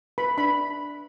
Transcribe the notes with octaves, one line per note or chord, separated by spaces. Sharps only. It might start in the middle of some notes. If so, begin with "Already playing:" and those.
B4 B5
D4 B5